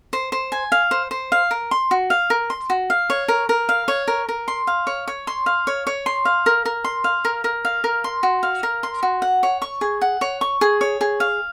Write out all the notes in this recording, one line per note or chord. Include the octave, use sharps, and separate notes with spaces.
C5
C5
G#5
F5
C5
C5
F5
A#4
C6
F#4
F5
A#4
C6
F#4
F5
C#5
A#4
A#4
F5
C#5
A#4
A#4
C6
F5
C#5
C#5
C6
F5
C#5
C#5
C6
F5
A#4
A#4
C6
F5
A#4
A#4
F5
A#4
C6
F#4
F5
A#4
C6
F#4
F#5
C#5
C#6
G#4
F#5
C#5
C#6
G#4
C#5
G#4
F5